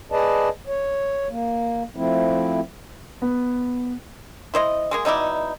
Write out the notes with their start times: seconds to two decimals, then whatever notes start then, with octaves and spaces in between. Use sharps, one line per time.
0.12 G#4 B4 D5 D#5 A5
0.68 C#5
1.30 A#3
1.97 F3 A3 C4 E4
3.22 B3
4.54 E4 C5 D#5
4.91 G#3 A#3 G#4
5.05 B2 D#4 E4 D5